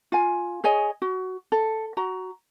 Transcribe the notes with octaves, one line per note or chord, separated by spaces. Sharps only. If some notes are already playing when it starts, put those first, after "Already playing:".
F4 F5 G#5
G#4 C#5 D#5 G#5
F#4
A4
F#4 A#5